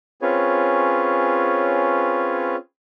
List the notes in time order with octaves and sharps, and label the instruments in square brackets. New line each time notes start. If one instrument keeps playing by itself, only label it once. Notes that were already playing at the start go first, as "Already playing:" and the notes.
[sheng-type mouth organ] C4 C#4 F4 G#4 B4 C#5